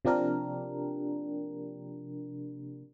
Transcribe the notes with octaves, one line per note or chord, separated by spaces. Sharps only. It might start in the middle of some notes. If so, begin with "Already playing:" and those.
C3 F3 A#3 D4 G4 A#4